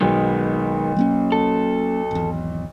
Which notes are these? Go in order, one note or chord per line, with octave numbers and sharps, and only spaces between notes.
B1 D#3 G#3 B3
F#3 A#3 C#4
A4
G#1 E2